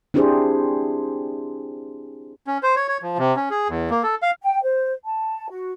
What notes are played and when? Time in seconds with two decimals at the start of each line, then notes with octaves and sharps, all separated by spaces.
0.14 C4 D4 E4 G4 G#4 C5
2.47 C#4
2.63 C5
2.76 C#5
2.88 C#5
3.02 F3
3.18 C3
3.36 C#4
3.50 G#4
3.69 E2
3.90 A#3
4.03 A4
4.22 F5
4.43 G5
4.63 C5
5.04 A5
5.50 F#4